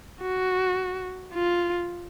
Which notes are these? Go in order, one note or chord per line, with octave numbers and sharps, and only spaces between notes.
F#4
F4